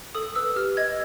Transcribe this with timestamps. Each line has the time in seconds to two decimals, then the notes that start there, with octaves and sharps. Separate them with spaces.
0.15 A4 D#6
0.36 B4 E6
0.56 G4 F6
0.77 D#5 G#6